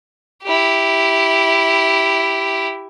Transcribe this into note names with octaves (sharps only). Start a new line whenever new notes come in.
E4 G4